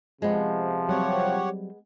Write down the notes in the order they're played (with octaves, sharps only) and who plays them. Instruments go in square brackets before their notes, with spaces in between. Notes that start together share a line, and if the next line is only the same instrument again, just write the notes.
[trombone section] C3 F3 [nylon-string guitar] G#3 B3
[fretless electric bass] F#3 G3 C4 [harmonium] G4 C#5 F#5